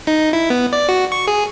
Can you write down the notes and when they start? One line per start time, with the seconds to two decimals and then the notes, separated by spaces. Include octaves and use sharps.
0.07 D#4
0.33 E4
0.50 B3
0.73 D5
0.89 F#4
1.12 C#6
1.28 G#4